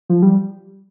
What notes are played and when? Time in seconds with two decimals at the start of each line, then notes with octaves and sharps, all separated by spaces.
0.09 F3
0.22 G3